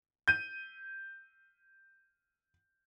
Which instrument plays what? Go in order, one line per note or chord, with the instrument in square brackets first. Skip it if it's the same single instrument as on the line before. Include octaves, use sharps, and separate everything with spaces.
[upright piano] G6 D#7